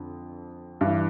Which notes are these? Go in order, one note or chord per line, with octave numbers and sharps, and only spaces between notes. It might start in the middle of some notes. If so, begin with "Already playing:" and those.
Already playing: F2 D3
G2 E3